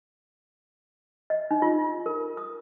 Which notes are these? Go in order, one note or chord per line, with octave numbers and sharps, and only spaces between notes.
D#5
D#4
F4
A#4
D#6